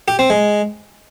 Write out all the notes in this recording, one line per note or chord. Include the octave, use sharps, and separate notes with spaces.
G4
C4
G#3